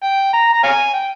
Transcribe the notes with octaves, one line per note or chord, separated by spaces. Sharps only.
G5
A#5
A#5
C#5 F5 G#5
G5